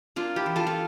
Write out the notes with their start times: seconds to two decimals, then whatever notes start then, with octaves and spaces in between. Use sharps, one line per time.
0.16 A#3 D4 F4
0.36 E4 G4
0.46 E3
0.56 F4 A4
0.67 F4